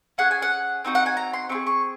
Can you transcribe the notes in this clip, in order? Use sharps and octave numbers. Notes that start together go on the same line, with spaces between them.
C#4 G#4 F#5
G#5
F#5
C4 D#4 F#4
F#5
G#5
A#5
C6
C4 F4 C#6
G#4
C#6